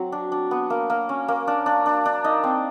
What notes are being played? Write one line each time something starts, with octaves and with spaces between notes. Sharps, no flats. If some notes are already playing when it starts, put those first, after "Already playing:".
Already playing: F#3 C4
D4
D4
B3
A#3
A#3
C#4
A#3
D4
D4
D4
D4
D#4
C4